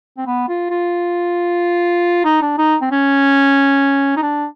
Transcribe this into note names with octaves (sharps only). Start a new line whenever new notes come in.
C4
B3
F4
F4
D#4
D4
D#4
C4
C#4
D#4
D4